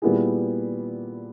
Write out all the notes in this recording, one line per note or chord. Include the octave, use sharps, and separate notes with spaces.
A#2 G3 B3 E4 G#4